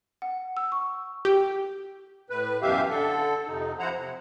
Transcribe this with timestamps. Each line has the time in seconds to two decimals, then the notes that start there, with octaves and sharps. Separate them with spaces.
0.22 F#5
0.57 E6
0.72 C#6
1.25 G4
2.30 A2 B4
2.62 F#2 B2 E3 G4 E5 F5
2.90 D3 A4
3.48 F2 C3 D#4
3.79 F3 E4 C5 F#5 A#5
3.95 C3